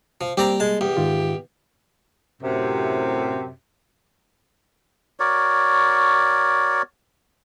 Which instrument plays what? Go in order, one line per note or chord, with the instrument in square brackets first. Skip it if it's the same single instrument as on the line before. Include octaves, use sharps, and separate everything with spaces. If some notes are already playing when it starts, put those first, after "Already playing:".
[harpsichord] F3
[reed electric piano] G3 A#3 [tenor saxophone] C4 [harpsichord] G4 D5 A#5
[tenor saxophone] G#3 [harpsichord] A5
[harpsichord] E2 [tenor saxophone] G4
[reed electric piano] G#2 D#3 F4
[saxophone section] F#2 A2 C3
[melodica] F#4 A#4 C#5 D5